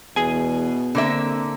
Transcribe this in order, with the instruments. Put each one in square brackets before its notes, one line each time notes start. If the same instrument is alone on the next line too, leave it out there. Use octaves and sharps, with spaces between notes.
[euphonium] E2 [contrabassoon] B2 [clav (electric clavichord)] G#4 G#5
[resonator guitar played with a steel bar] D3 A#3 E5 [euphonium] C4